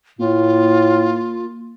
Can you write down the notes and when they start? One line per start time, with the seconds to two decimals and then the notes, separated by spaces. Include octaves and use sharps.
0.19 A2 A#3 F4